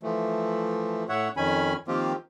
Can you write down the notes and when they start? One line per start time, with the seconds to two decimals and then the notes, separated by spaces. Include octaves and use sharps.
0.03 E3 F3 A3
1.09 A2 C#5 E5 F#5
1.37 F2 D#3 C#4 G#5 B5
1.88 D#3 F3 A#3 C4 F4 G4